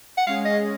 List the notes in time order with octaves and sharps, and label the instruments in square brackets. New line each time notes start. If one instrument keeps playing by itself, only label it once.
[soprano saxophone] F#5
[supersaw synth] G#3 C#4 G#4 [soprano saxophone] F5
[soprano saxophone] D#5